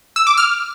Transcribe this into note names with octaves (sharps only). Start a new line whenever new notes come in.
E6
D6
F6